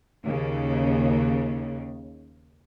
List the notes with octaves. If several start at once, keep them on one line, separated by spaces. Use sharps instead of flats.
D#2 C#3